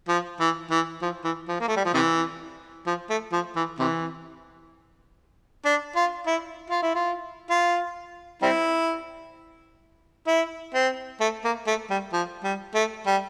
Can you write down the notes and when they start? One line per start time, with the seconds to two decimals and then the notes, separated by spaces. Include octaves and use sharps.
0.08 F3
0.40 E3
0.71 E3
1.02 F3
1.24 E3
1.48 F3
1.60 A#3
1.68 A3
1.77 G3
1.85 F3
1.94 C3 E3
2.87 F3
3.10 A3
3.33 F3
3.56 E3
3.79 C3 E3
5.65 D4
5.96 F4
6.27 E4
6.70 F4
6.83 E4
6.95 F4
7.50 F4
8.42 G3 C4 E4
10.27 E4
10.74 C4
11.21 A3
11.44 A#3
11.67 A3
11.90 G3
12.13 F3
12.44 G3
12.75 A3
13.07 G3